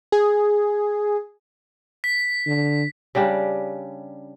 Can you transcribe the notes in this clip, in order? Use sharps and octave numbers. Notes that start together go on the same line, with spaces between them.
G#4
B6
D3
C#3 G3 D4 G4